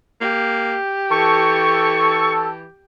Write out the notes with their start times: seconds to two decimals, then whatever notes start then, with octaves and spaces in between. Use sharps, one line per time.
0.21 A#3 G4
1.11 E3 A4 C#6